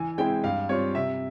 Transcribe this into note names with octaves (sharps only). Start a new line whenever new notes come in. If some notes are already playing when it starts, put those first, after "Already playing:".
Already playing: E3 G#5
G#3 C4 E4 G5
G2 F5
G3 C4 F4 C#5
C3 E5